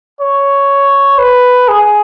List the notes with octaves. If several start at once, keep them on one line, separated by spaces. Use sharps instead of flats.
C#5
B4
G#4